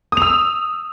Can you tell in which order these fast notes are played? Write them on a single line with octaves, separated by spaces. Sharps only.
D#6 F7 E6